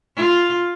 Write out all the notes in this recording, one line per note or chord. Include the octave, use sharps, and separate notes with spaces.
F4